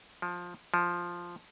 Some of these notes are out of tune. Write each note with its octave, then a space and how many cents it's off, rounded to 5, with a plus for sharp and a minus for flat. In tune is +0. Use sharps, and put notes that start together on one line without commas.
F3 +15
F3 +0